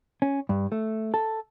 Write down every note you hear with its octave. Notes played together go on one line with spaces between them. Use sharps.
C#4
G2
A3
A4